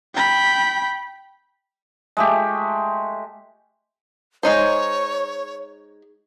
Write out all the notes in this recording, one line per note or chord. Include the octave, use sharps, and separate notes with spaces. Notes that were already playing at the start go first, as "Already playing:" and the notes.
G5 B5
G#3 A3 G4
G#3 D#4 C5 C#5